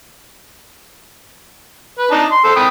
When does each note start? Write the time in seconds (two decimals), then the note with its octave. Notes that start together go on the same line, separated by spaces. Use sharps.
1.98 B4
2.11 D4 D#4
2.31 C6
2.45 A4 C5
2.56 G5 B5 D#6